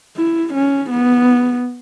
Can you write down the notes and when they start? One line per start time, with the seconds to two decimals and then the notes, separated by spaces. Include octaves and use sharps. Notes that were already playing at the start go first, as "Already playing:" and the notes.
0.16 E4
0.53 C#4
0.90 B3